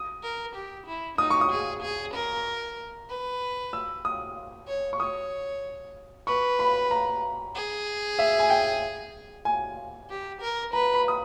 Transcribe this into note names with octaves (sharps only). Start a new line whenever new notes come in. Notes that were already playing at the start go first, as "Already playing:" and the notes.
Already playing: D#6
A#4
G4
E4
D#4 D#6
C#6
D#6
G#4
G#4
A#4
B4
E6
D#6
C#5
C#6
C#5 D#6
B4 C#6
B5
A#5
G#4
E5
G#5
G5
G#5
G4
A#4
B4 A#5
B5
D#6